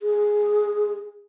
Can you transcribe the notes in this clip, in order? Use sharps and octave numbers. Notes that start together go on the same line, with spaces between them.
G#4